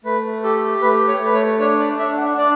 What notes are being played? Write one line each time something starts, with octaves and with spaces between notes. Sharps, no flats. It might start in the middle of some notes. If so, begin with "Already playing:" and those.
A3 B4
G4 A4
A3 B4
C#5
A3 B4
C#5
D4 C#5
D5
D4 E5
F#5
D4 D5